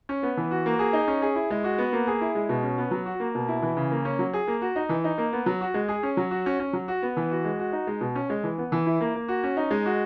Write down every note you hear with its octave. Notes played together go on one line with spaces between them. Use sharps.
C#4
B3
E3
F#4
A#3
G#4
D#4
C#4
G#4
E4
G#3
F#4
B3
A#3
G#4
E4
G#3
B2
C#4
B3
F#3
F#4
A#3
B2
E4
E3
C#3
A#3
C#4
F#3
G#4
A#3
F#4
D#4
E3
D#4
A#3
B3
F#3
F#4
G#3
G#4
C#4
F#3
F#4
C#4
C#4
F#3
F#4
B3
E3
F#4
G#3
F#4
D#4
G#3
B2
C#4
G#3
E3
B3
E3
E4
A#3
A#3
F#4
C#4
D#4
G#3
F#4